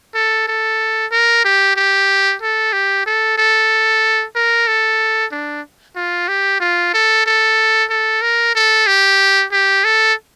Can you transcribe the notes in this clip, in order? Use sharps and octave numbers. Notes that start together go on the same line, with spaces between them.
A4
A4
A#4
G4
G4
A4
G4
A4
A4
A#4
A4
D4
F4
G4
F4
A4
A4
A4
A#4
A4
G4
G4
A4